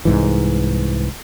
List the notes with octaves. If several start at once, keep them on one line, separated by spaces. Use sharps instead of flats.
C2 G#2 E3